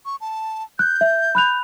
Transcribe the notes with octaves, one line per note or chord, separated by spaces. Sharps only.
C#6
A5
F#6 G6
E5
B5 F#6 F7